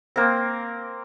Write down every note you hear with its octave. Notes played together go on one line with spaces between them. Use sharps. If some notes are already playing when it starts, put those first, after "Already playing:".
A#3 C4